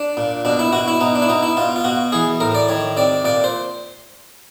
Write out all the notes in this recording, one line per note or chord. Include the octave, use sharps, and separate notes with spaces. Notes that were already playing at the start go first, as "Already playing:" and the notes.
Already playing: D4
A#2
B2 D4
E4
B2 F#4
E4
B2 D#4
D4
E4
B2 D#4
E4
B2 F4
F4
B2 F#4
E3 G#4
A2 A#4
D5
D#3 C#5
C3 D5
A#2 D5
C5